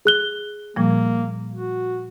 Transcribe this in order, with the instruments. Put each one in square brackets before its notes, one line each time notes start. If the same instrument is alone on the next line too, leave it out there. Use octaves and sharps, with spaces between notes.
[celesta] G#4 F#6 G7
[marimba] A#2 F3 G3 [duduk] A#3
[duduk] F#4